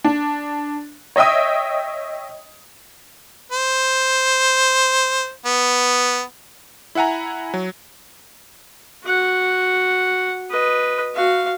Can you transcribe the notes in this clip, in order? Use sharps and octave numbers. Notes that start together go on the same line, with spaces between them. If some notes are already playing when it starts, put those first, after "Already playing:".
D4
C#5 D#5 E5 G5 D#6
C5
B3
E4 E5 F#5 G#5 A#5
F#3
F#4 F#5
B4 D#5
F#4 F5